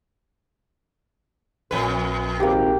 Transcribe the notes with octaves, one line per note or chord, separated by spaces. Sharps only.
A#1 F2 B4
G#1 A#3 G4